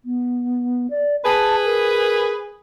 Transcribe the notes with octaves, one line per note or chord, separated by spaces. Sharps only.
B3
D5
G#4 B4 A5
A#4